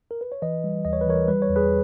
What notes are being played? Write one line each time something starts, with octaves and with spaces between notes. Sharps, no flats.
A#4
B4
C#5
E3 B4 D#5
G3
D#2 D#5
C#5
B4
E3 A#4 C#5
G3 B4
C#5
E2
G#4 B4